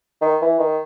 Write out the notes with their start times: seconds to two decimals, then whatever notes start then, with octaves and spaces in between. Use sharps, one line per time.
0.22 D#3
0.42 E3
0.60 D#3